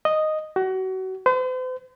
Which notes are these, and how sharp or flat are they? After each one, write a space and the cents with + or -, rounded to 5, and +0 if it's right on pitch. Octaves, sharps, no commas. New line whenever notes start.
D#5 -5
F#4 +30
C5 -45